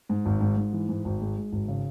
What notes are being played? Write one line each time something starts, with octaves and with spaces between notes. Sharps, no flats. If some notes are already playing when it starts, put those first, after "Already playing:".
G#2
G#1
G#2
G#2
E3
G#2
G#1
G#3
G#3
G#1
C#3